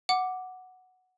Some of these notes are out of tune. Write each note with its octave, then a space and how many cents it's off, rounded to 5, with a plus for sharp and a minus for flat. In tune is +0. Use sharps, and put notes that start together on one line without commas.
F#5 +0 D6 +0